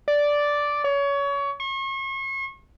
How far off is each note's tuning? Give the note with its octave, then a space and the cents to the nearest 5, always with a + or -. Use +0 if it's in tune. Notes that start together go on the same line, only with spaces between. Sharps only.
D5 -5
C#5 +25
C#6 -40